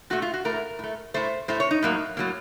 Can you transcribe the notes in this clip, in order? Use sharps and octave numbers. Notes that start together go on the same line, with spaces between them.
A#2 A3 F#4
F4
F#4
A2 A3 A#4
A2 A3
A2 A3 C5
A2 A3 C5
C#5
D#4
A2 F#3 A#3
A2 F#3 A#3